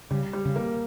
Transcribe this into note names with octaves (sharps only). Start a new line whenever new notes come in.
C#3 G3
G3
C#3
A#3